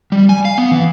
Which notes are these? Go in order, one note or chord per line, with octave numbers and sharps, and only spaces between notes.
G3
G#5
F5
B3
E3